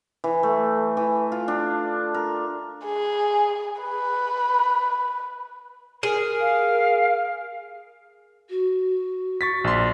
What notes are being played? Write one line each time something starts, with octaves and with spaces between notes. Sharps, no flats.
E3
A3
E3
F4
D4
A#4
G#4
B4
G#4 A#4
F5
F#4
C#6 A6 B6
A#1 C6